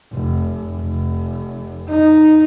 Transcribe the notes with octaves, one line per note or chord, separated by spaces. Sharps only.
F1
F1
D#4